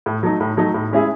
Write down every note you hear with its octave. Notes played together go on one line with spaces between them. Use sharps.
A2
F#3 A3 D#4
A2
F#3 A3 D#4
A2
G#3 C#4 E4 G#4